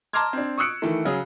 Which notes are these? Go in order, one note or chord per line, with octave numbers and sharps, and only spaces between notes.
A5 A#5 C6 D6 F6 G#6
C4 D4
C#6 D#6 E6 F#6 C#7 D7
D#3 E3 A3
C#3 F#3 G#4